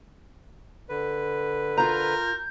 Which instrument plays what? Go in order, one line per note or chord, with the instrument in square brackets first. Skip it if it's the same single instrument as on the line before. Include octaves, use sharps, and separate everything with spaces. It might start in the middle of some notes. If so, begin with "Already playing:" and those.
[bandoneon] D3 B4
[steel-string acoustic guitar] F4 A#5 [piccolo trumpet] A#4 [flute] G6